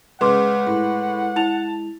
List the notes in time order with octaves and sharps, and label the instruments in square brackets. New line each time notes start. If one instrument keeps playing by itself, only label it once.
[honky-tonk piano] C#3 [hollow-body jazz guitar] G#3 [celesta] B4 C6 D6 [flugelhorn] F#5
[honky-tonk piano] A2
[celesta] E4 F7 [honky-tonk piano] A5